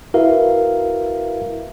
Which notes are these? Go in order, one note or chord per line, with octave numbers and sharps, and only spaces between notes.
E4 F#4 A#4 B4 E5 F5